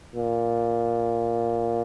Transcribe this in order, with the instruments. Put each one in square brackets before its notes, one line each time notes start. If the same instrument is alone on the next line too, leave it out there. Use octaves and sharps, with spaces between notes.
[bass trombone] A#2